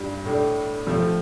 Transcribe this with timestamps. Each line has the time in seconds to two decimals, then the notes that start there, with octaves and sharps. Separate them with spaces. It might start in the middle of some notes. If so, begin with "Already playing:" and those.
Already playing: G2 G3 D4
0.25 A2 A3 D4
0.86 C3 F3 A3